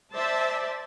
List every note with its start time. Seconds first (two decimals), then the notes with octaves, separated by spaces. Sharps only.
0.13 C5 D5 E5 A5